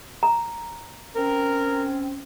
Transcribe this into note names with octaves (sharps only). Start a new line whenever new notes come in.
A#5
C4 C#4 A#4